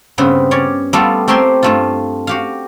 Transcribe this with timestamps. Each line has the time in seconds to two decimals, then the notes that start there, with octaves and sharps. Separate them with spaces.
0.18 G2 C#3 B3 C4 B4
0.51 C#4 C#5 D5
0.93 G3 A3 B3 F4 A4 F5
1.28 A3 C4 G4 A#4 G#5 C6
1.63 G2 A3 F4
2.27 F#4 G4 F5